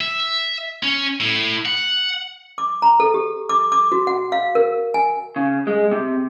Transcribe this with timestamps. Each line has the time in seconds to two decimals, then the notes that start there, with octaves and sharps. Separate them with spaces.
0.01 E5
0.83 C#4
1.20 A2
1.65 F#5
2.58 D6
2.82 A#5
3.00 A4
3.14 G4
3.49 D6
3.72 D6
3.92 F#4
4.07 F#5
4.32 F5
4.55 A#4
4.94 G#5
5.36 C#3
5.67 G#3
5.91 C3